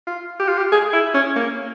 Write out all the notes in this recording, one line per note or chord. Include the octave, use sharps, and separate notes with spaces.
F4
G4
F4
G4
G#4
E4
C#4
A#3